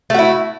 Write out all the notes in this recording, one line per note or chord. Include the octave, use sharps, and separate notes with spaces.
A3 E4 F#4